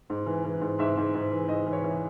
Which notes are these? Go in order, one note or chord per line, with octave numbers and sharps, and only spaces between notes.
G#2
E3
E3
G#2
G#2 E5
G#2
G#2
E3
G#2 D#5
E3
C#5
E3